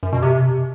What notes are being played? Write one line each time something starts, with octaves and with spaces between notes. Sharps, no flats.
F#2
B2
C3